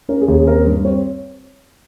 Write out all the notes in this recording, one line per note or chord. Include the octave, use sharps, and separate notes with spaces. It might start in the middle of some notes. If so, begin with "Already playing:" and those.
C#4 A#4
G#4
D#2
G#4
C4 A#4
G2
C4 C#5